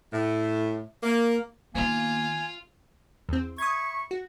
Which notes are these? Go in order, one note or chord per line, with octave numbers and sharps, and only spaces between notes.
A2
A#3
D#3 A#3 B3 F4 G#5
E2 C4
E5 B5 C#6 D#6 G#6
F#4